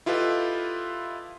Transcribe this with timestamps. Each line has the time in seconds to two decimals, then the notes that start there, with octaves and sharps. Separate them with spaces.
0.06 E4 F4 G4 A4 B4 D#5